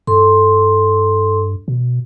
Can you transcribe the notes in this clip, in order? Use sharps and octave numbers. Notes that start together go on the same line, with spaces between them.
G2 A4 C6
B2